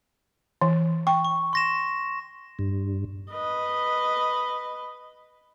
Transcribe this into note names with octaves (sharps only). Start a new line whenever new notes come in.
E3
G5 C#6
C#6
C6 A#6 E7
G2
B4 D#5